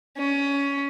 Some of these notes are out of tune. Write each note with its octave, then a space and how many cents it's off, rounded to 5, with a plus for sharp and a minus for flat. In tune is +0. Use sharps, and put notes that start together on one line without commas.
C#4 +15